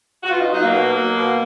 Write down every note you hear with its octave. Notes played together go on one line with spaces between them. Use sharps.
F#4
B2 F4
D#4
F#3 D#4
A#3
B2
F#3
B2